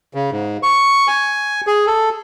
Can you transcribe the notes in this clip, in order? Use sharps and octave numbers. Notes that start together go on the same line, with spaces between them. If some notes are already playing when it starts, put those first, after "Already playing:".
C#3
G#2
C#6
G#5
G#4
A4